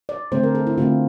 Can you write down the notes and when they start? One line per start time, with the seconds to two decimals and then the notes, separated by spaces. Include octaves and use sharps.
0.09 D5
0.32 D3 A3 C4 C5
0.43 A#4
0.55 A4
0.67 E4
0.78 D3 A3 C4 F4